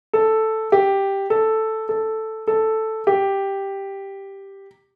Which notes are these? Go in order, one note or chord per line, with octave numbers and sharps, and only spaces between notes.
A4
G4
A4
A4
A4
G4